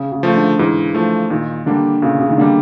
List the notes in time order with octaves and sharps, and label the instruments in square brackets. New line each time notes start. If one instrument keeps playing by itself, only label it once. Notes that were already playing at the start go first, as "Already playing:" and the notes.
Already playing: [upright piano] C#3
C#3
[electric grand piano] F3 A3
[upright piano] D3
[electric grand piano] G#2 [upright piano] E3
[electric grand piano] F3 A3
[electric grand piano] A#2 [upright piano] D#3
[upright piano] D3 [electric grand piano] G3 A#3 D4
[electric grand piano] A#2 [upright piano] C#3
[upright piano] C#3
D#3
[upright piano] D3 [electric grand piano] G3 A#3 D4